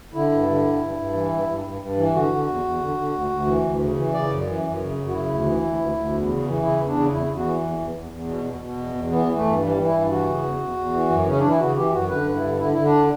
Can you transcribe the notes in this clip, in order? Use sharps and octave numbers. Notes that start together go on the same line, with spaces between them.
D3 E4
G2
D3
G2
G2
G2
E3
G2
G2
G2
G2
E3
D3 F#4
D3
E2
E2
D3
D3
D2
D2
E3
D2
C#3
E3
C#3 D5
F#2
E3
F#2
C#3
F#2
F#4
C#3 E4
D2
E3
D2
D2
D2
E2
C#3
E3
C#3 E4
E2
D4
C#3
E2 E4
E2
F#4
E3
E2
E2
E2
E2
B2
B2
B2
E2
E2
E3 B3
E3
A3
G2
E3 G3
E3
E4
G2
E3 F#4
C#3
E2
E2
E2
E3
F#2
C#3 C#4
E3 D4
E4
C#3 F#4
E3 G4
F#2 F#4
D3 B4
G2
E4
D3
D3 E4
D3 E4
D4